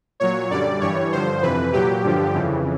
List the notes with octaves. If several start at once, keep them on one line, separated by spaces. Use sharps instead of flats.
A#2 F#3 C#5
F#2 D3 G3 D5
G2 E3 G3 C#5
G2 D3 F3 C5
F2 C3 E3 B4
A#2 F#3 G4
G2 D3 F3
F2 C#3 E3